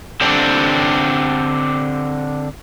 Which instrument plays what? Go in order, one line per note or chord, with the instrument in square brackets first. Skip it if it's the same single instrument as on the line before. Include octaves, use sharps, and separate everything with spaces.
[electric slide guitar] D3 C4 D4 G4